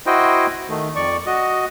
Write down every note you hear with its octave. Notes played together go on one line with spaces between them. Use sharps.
E4 F#4 C5 D#5 G5
D#3 A3
F2 D5 C#6
F#4 D#5